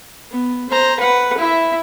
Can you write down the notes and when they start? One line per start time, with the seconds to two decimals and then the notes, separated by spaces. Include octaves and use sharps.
0.31 B3
0.70 C5 A#5
1.00 B4 F#5
1.38 E4 E5